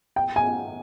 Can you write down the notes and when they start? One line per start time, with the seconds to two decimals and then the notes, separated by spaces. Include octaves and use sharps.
0.16 G5
0.36 G#5